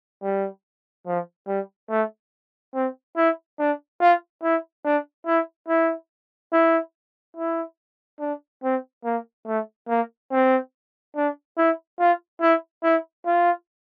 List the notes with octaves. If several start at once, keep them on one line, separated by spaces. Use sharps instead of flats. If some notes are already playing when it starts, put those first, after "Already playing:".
G3
F3
G3
A3
C4
E4
D4
F4
E4
D4
E4
E4
E4
E4
D4
C4
A#3
A3
A#3
C4
D4
E4
F4
E4
E4
F4